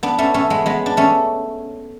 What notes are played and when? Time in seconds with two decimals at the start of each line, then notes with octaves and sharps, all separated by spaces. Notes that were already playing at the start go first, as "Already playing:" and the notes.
0.03 B3 D4
0.18 A3 C#4
0.34 A3 C#4
0.50 G#3 B3
0.66 G#3 B3
0.86 D4
0.97 A3 C#4